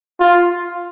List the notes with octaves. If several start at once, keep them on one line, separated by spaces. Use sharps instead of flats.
F4